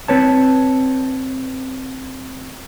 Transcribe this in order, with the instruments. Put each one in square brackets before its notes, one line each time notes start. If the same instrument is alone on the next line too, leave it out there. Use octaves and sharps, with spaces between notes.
[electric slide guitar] C4 B4 C#5 A5